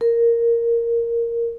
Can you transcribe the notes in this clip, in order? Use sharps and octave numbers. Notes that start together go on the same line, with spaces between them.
A#4